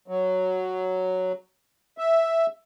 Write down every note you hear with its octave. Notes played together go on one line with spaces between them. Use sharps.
F#3
E5